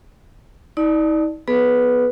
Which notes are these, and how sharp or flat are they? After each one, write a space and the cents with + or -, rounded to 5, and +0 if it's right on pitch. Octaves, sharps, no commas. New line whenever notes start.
D#4 +40 D5 +20 A5 +0
B3 +0 G#4 +40 B4 +0